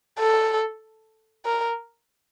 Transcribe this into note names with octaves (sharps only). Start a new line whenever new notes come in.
A4
A#4